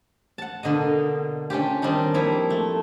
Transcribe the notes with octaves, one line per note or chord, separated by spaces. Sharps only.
F#5 A5
B2 D3 A#3 D#5
C#4 D4 F4 G4
D#3 G3 C4 D4 D#4
F3 A#3 E4
A3